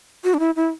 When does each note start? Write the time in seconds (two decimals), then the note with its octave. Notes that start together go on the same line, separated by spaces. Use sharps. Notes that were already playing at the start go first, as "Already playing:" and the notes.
0.24 F#4
0.34 D4
0.40 E4
0.56 E4